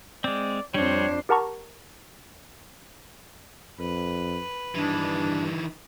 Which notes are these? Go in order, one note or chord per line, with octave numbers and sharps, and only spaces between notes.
G#3 C4 D5
F2 G3 C4 D4 C5 C#5
G4 A#4 F#5 A5 A#5 C#6
F2 B4
G2 D#3 E3 D4